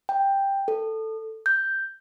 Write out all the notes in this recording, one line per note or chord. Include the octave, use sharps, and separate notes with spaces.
G5
A4
G6